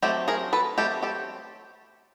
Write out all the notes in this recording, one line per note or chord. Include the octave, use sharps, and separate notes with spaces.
F#3 A3 C4 G4 A4
G#4 A#4
A4 B4
F#3 A3 C4 G4 A4
G4 A4